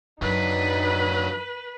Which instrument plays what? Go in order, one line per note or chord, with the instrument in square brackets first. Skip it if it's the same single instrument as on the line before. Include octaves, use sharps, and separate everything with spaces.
[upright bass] F#2 [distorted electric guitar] F#3 D4 [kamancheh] D#4 [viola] B4